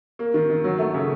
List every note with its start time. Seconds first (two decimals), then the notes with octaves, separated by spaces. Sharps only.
0.19 A#3
0.34 D#3
0.49 D#3
0.64 F#3
0.79 A3
0.94 C#3